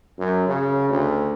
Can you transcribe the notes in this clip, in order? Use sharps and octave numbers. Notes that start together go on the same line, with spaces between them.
F#2
C#3
D2